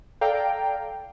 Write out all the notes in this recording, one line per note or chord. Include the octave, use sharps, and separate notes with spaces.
A4 D5 F5 G5 A#5